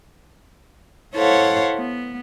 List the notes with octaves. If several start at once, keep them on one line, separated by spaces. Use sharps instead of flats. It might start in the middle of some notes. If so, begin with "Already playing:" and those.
E4 A4 C5 C#5 F5 F#5
B3